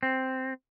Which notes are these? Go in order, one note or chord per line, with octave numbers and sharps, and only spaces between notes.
C4